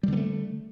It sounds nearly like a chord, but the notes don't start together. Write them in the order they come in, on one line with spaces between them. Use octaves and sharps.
G3 D3 B3 A3